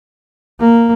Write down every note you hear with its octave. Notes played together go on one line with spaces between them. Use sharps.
A#3